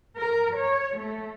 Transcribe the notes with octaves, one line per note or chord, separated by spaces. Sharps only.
A#4
C#5
A3